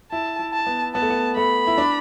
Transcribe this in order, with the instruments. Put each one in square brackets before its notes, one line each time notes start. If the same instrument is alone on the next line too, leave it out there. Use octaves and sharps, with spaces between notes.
[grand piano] E4 [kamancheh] A5
[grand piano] E4
[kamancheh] A5
[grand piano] B3
[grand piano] B3 [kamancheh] A5
[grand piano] A3
B3
[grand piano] A3 [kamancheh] B5
[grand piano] E4
D4